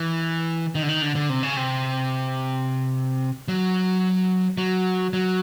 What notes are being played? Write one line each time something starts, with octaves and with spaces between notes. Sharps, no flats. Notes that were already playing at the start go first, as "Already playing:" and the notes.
Already playing: E3
D#3
D3
D#3
D3
D3
C3
C#3
C3
F#3
F#3
F#3